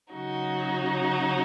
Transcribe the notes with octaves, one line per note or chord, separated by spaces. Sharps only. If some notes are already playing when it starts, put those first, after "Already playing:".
C#3 F#3 D#4 F#4